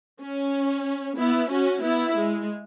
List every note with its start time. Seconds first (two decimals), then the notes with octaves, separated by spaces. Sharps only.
0.21 C#4
1.17 B3 E4
1.50 C#4 F#4
1.83 B3 E4
2.16 G#3